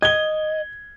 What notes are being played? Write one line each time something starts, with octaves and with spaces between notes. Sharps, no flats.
D#5 G#6 G7